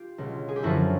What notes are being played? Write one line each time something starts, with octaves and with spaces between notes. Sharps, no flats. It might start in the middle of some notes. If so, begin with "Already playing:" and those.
Already playing: F4 G4
C#2 B2
G#4
G4
F#2 D3 F3 E4 F#4